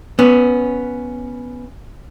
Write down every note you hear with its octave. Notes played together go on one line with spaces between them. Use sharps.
B3 C#4